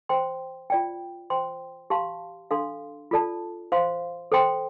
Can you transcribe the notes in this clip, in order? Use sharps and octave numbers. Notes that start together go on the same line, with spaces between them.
C5 G5 C6
F4 D5 G5
C5 G5 C6
G4 F5 A5 C6
D4 A4 F5 C6
F4 A4 D5 A5
C5 F5 C6
A4 C5 G5 C6